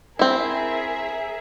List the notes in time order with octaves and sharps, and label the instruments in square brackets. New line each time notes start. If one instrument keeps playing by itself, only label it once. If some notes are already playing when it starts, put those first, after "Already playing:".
[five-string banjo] C4 E4 [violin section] G#4 A#4 E5